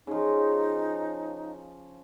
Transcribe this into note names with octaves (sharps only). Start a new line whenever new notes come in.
C#3 F3 D#4